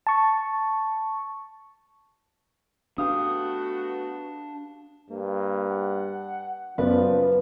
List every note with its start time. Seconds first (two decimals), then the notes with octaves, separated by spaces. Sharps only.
0.07 A5 C#6
2.98 A3 B3 D4 F#4 G4 F5 D#6
5.10 G2 A#3
5.70 F#5
6.78 F#1 F3 B3 B4 D5